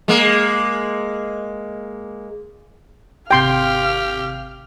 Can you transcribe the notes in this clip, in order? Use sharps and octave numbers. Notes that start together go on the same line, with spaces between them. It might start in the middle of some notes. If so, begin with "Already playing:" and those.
G#3 A#3
G#1 C3 G4 F5 G5 C6 F6